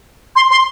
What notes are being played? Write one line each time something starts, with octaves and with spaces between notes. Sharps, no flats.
C6
C6